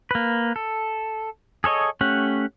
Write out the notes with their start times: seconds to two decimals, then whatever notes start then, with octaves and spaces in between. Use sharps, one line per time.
0.11 A#3 B4
0.56 A4
1.64 G#4 A4 C#5 D#5
2.01 A3 C#4 G4 F#5